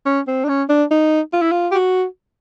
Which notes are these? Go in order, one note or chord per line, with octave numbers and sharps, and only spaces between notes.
C#4
C4
D4
C#4
D4
D#4
F4
E4
F4
G4
F#4